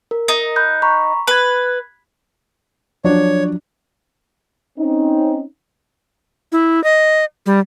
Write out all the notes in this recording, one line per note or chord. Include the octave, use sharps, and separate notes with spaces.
A#4
D#4
B5 F#6 G6
A#5 B5 C#6
B4 F#6 G#6
F3 F#3 D4 C#5
C4 C#4 D#4
E4
D#5
G3